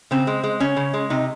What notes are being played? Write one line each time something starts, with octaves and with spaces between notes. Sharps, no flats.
C#3 C4
G#3
G#3
C#3 C#4
C#3
G#3
C3 D#4